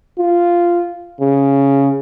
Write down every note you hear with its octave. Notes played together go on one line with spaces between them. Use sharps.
F4
C#3